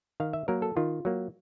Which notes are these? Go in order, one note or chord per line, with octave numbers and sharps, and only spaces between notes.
D#3 F5
E5
F#3 A#3 A#4
A4
D#3 F4
F#3 A#3